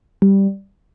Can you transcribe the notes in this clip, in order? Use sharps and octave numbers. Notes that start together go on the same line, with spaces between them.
G3